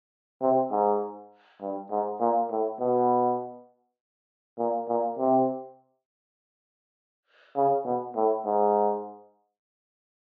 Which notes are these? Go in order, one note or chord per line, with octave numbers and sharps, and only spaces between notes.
C3
G#2
G2
G#2
A#2
A2
B2
A#2
A#2
C3
C#3
B2
A2
G#2